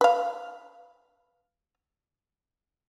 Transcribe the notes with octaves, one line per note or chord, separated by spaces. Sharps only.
B4 F5